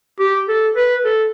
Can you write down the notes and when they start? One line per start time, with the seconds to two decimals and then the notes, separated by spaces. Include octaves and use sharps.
0.20 G4
0.48 A4
0.76 B4
1.05 A4